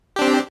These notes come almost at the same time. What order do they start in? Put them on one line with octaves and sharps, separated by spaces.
G4 D4 C4